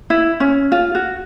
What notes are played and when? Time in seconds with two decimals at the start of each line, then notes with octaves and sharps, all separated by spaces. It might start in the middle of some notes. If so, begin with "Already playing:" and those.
0.10 E4
0.40 C#4
0.72 F4
0.95 F#4